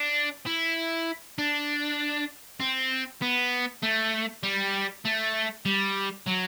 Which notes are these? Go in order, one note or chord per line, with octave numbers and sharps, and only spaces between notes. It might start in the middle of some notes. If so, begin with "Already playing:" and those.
Already playing: D4
E4
D4
C4
B3
A3
G3
A3
G3
F#3